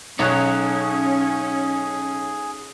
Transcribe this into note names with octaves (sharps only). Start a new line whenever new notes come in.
B1 C#4 D#4 G#4 C#5 F#5 A#5 F#6